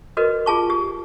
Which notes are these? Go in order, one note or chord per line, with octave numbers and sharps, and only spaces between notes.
F#4 A#4 B4 D#5
F4 G#4 A5 C#6
G4